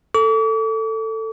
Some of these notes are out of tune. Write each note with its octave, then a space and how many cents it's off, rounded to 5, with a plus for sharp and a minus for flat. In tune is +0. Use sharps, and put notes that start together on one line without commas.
A4 +15 D6 -45